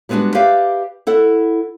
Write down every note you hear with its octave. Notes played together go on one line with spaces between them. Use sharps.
G3 G#3 B3 C4 D4 F#4
G4 B4 D5 E5 F5
E4 A4 F#5